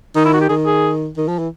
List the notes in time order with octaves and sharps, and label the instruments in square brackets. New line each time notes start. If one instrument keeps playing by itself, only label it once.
[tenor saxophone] D#3 [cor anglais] D#4
[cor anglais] E4
F#4
G4
[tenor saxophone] D#3 [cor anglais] G#4
[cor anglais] G#4
[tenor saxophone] D#3
F3
E3